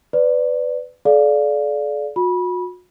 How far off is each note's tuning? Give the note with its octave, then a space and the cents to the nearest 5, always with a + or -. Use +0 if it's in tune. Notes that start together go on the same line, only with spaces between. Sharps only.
B4 +20 D5 +0
A4 -45 D5 -10 F5 +0
F#4 -40 B5 -20